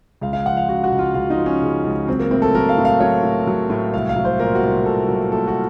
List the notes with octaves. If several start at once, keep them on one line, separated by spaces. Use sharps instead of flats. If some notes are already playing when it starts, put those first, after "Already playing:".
C#2 F5
F5
F3 F#5
F5
C#3 F#4
F#4
C#2
F4
C#2 F4
D#4
F3
C#4
C#3
C#2
F#3 C4
A#3
A2 C4
A4
F#3 A#4
F5
A2
F5
F#3 C#5
A2
F#3
A2
C2 F5
F5
F#3
C5
A#2 A#4
F#4
C2
C2 A4
F#3
A#2 A4
F#4